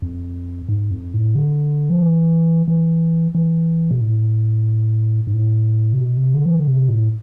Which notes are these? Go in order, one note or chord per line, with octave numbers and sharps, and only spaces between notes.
F2
G#2
F2
A2
D3
F3
E3
E3
E3
B2
A2
G#2
A2
C3
B2
C3
D3
F3
E3
D3
C3
A2